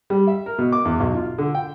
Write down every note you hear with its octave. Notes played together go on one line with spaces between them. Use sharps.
G3
E5
A#4
B2
D6
E2
B1
F4
D3
G5